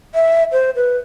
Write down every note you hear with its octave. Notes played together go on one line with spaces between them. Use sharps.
E5
C5
B4